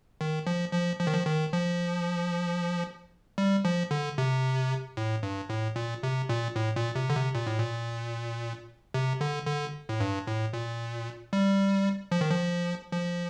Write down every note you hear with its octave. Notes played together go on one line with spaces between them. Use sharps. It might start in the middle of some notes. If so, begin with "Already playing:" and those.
D#3
F3
F3
F3
D#3
F3
D#3
F3
G3
F3
D3
C3
A2
G2
A2
A#2
C3
A#2
A2
A#2
C3
D3
C3
A#2
A2
A#2
C3
D3
D3
A2
G2
A2
A#2
G3
F3
D#3
F3
F3